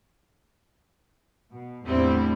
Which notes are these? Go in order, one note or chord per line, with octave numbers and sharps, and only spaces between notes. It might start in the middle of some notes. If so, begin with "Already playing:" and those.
B2
E2 A2 D3 G3 C4 E4